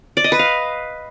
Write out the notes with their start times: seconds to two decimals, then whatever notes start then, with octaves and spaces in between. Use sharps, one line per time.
0.17 D5
0.24 D#5
0.32 B4
0.39 F5